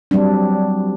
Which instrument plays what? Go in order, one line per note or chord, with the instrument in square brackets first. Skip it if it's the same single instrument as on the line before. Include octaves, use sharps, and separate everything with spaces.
[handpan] F#3 G3 C4 D4